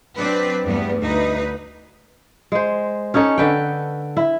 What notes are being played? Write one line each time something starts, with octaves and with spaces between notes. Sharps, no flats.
F#3 C4 D4 B4 D5
E2 G2 G3 A3 B3
D2 D#4 B4
G#3 C5
C#4 D#4 A4 C#5
D3 B4 G5
E4